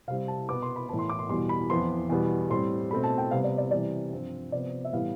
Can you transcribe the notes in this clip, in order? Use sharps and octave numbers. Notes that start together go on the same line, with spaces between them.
C3 G3 C4 F5
A5
B2 B3 D6
C6
B5
A2 E3 B3 A5
C6
D6
C6
E2 B2 G3 C6
B5
F2 E3 B3 C6
E2 B2 G3 B3
A2 G3 C4 C6
B2 A3 C4 B5
A5
G5
C3 G3 B3 F5
D5
D5
C3 E3 G3 D5
G2 F3 C4
C3 F3 B3 D5
E5
A2 E3 G3 B3 F5